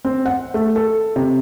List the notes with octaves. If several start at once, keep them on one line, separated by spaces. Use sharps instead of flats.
C4
F#5
A3
A4
C3